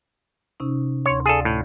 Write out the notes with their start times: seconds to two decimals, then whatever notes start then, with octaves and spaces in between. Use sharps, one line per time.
0.60 C3 C#4 D#4
1.06 D2 C#5 C6
1.26 G#4 A4 D5 F5 A6
1.45 A2